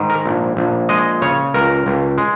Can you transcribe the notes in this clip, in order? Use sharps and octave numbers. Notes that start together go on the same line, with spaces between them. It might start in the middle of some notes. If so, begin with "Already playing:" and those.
Already playing: G#2 D#3
A#4
A#1
A#1
G#3 D#5
C#3 C#5
C#2 A#4
C#2
G#3